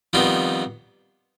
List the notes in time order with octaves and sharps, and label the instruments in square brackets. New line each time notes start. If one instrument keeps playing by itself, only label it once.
[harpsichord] F2 D#3 G3 B3 F4